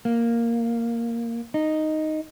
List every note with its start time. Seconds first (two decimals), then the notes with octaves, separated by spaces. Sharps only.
0.05 A#3
1.54 D#4